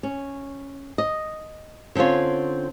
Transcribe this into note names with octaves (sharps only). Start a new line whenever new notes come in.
C#4
D#5
D3 C4 C#4 F4 C#5